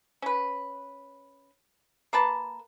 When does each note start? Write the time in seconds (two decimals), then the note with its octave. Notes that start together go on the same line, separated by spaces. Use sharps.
0.22 C#4 B4
2.13 A#3 B4 A5